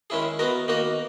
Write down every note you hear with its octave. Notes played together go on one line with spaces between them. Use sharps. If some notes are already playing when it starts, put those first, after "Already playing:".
D#3 G#3 C#4 E4 G#4
B3 F#4 A#4 D#5
D#3 A#3 D#4 F#4 A#4